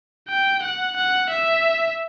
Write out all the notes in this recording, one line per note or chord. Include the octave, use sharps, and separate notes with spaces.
G5
F#5
F#5
E5